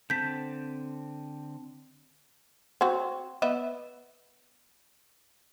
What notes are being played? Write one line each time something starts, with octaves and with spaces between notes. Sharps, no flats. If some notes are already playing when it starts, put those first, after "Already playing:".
D3 C4 A5 G6 B6
C4 F#4
B3 D#5 E5